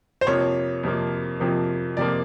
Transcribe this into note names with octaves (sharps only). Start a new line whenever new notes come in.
C5
F2 C3 F3 A#3 C#5
F2 C3 F3 A#3
F2 C3 F3 A#3
F2 C3 F3 A#3 D5